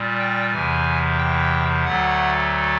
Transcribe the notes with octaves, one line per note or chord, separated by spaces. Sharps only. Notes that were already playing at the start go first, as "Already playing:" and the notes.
Already playing: A#2 G3
G5
E2 C3 E3 G#5
G5
D2 D3 F#3 A3 F#5